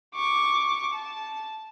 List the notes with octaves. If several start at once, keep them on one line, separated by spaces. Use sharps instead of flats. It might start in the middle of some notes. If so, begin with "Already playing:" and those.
C#6 D6
A5